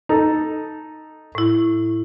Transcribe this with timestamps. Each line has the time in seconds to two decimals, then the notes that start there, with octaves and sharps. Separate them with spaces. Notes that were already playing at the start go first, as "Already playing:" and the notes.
0.09 D#4 A4
1.35 A2 E4